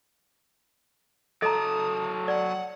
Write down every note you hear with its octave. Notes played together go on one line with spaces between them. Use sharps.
F#3 A4 D#5 A5 A#5 D#6
D5 F#5